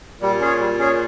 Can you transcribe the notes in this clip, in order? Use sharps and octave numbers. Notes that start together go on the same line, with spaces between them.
A#2 G3
C#4 G#4 C#5
G3
C#4 G#4 C#5